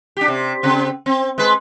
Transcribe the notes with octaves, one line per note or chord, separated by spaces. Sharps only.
D4 G4
C3
C#3 C4
C4
G#3 B4